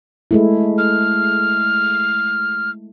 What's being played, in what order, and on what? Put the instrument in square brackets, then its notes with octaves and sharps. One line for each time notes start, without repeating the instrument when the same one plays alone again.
[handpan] G#3 A3 E4
[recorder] F6